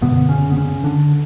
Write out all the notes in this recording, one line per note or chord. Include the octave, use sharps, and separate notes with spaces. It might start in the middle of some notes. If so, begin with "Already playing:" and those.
F#2 B2 D3 B3
C#3 C#4
B3
C#3 C#4
D3 D4